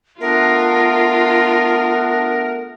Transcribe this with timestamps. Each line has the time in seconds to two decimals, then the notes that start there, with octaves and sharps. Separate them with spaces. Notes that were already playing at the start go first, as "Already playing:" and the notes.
0.21 A3 B3 D4 F4 A#4